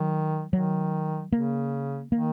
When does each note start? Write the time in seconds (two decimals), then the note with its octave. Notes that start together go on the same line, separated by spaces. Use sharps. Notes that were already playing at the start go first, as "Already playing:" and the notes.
Already playing: D#3 F#3
0.52 D#3 F#3
1.32 C#3 A#3
2.11 D#3 A#3